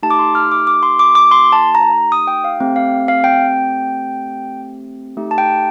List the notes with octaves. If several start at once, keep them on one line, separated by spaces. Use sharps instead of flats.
A3 D#4 G4 A5
D6
C6
F6
D6
D6
C6
D6
D6
C6
A5
A#5
D#6
G5
F5
A3 C4 G4 G5
F5
F5
G5
A3 D#4 G4
A5
G5